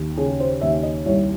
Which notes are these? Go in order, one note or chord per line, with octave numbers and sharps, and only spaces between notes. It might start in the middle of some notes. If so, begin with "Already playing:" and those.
Already playing: D#2
C#3 G#4
C5
D#2 E5
D#5
C2 C#5